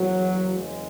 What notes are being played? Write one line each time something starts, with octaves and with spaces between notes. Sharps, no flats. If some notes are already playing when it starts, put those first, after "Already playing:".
Already playing: F#1 E2 C#3 F#3
G#3